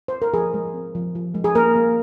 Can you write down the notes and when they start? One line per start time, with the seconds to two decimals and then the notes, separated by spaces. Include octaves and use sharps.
0.08 C5
0.22 A#4
0.34 F3 G#4
0.54 G#3
0.74 C4
0.95 F3
1.15 F3
1.35 G#3
1.44 G#4
1.55 A#3 A#4
1.76 A#3